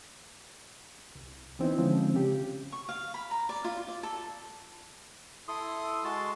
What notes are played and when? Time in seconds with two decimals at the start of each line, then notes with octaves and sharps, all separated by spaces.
1.15 C2
1.59 E3 B3 C4 D#4 E4
1.78 D3 F3 G#3 C4 C#4
2.14 C#3 G4
2.72 C#6
2.89 F5
3.14 B5
3.31 A#5
3.49 D5
3.65 F4
3.88 D5
4.03 A4
5.48 E4 A4 C6 D#6
6.04 G#3 F#4 A5 C6